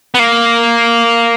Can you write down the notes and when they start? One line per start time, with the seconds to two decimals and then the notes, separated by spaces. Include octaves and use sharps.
0.14 B3
0.19 A#3